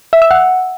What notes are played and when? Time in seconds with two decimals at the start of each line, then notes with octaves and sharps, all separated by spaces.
0.13 E5
0.22 E6
0.31 F#5